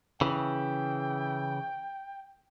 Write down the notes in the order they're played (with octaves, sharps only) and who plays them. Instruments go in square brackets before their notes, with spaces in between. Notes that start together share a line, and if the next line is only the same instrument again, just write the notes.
[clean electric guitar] C#3 E3 [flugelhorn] G5